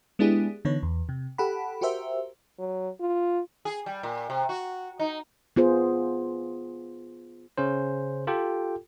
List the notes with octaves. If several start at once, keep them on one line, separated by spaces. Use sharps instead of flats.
G#3 B3 D4 E4 G4 G#4
D3 E3 B3 D#4 B4 C#5
E2
C3
G4 A4 F#5 B5
F#4 G4 A#4 C5 E5
F#3
F4
G#4
G3
A#2
C3
F#4
D#4
B3 F4 G#4 C5
C#3 C#4 C5
F4 G4 A4 G5